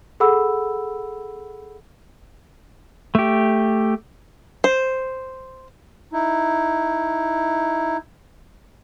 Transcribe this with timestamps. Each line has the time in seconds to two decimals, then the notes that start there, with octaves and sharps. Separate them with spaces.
0.20 G#4 A4 F#5 B5 E6
3.15 A3 G4
4.64 C5
6.13 D#4 E4